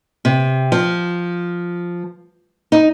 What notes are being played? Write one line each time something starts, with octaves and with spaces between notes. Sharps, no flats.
C3
F3
D#4